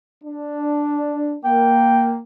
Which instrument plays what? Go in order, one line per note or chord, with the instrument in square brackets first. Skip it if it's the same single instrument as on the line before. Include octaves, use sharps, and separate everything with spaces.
[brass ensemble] D4
[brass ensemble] A#3 [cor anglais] G5